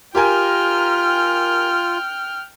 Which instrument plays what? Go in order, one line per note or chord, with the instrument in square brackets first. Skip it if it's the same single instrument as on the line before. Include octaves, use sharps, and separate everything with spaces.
[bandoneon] F4 [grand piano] G4 A#4 G#5 [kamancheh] G5 F6